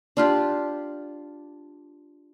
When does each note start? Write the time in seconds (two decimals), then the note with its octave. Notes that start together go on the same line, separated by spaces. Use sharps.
0.17 D4 F4 G4